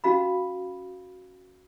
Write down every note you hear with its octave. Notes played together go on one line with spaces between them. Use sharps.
C#4 F#4 F5 B5